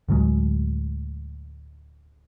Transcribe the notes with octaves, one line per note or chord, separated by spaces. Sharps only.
D2 A2 F#3 G#3